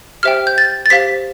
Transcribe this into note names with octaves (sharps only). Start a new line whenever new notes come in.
G4 C5 E5 G5 F6
G6
A6
A6
G4 C5 F5 B6